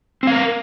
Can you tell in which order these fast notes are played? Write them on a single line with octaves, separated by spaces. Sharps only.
C4 F5 A#4